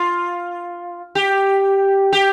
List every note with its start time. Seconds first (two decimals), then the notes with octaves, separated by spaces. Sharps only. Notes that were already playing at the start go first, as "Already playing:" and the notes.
Already playing: F4
1.15 G4
2.13 G4